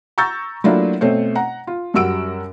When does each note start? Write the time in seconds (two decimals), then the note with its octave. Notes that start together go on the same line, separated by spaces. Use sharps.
0.18 A#5 C#6 E6 G6 A6
0.64 F#3 A3 A#3 D4 E4 F4
1.01 B2 A3 C4 C5 C#5
1.35 F#5 A#5
1.67 F4
1.94 F#2 G3 F#4 E6 D7